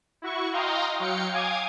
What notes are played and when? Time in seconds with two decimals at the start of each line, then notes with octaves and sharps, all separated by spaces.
0.22 E4 F#4 C#6
0.53 D#5 F5 G5 A#5 C6
1.00 F#3 F5 G5 C#7
1.32 F5 G#5 D6 D#6 G#6